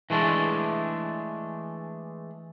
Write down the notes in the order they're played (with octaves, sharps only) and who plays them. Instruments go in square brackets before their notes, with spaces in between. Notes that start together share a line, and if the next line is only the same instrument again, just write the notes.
[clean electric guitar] E3 G#3 A3 D4